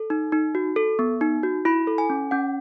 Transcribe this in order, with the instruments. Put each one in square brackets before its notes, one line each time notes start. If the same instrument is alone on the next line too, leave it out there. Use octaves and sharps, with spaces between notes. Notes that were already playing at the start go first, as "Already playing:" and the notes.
Already playing: [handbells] A4
D#4
D#4
F#4
A4
B3
D#4
F#4
E4 B5
A4
G#5
C#4
C#4 F#5